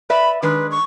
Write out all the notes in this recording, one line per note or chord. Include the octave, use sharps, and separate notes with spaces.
B4 D5 E5 B5
D#3 G#3 D4 B4
C#6